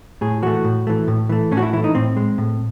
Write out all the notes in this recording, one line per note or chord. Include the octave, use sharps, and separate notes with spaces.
A2 G#4
E3 A3 F#4
A2
E3 A3
A2
E3 A3
A2 C#4
F#4
E4
E3 A3 E4
D#4
A2 C4
G#3
A2